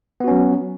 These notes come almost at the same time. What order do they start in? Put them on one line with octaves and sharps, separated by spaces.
B3 F#4 C#4 F#3